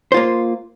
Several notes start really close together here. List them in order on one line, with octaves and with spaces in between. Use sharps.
C5 F4 A#3